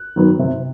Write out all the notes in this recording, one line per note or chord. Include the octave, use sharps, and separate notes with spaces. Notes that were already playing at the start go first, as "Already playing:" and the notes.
Already playing: F#6
D#3 F#3 B3
C3